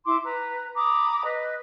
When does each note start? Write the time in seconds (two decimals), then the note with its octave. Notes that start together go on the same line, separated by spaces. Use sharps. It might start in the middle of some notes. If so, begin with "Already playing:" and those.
0.05 E4 C6 D6
0.24 B4 A#5
0.75 A#5 B5 D6 D#6
1.24 B4 D#5